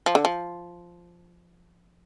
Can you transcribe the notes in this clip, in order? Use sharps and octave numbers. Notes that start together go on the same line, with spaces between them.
F3
D3
F3